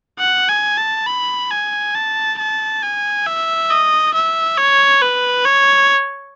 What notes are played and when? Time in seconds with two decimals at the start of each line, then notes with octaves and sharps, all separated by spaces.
0.19 F#5
0.49 G#5
0.77 A5
1.07 B5
1.51 G#5
1.94 A5
2.39 A5
2.83 G#5
3.26 E5
3.70 D#5
4.14 E5
4.58 C#5
5.02 B4
5.45 C#5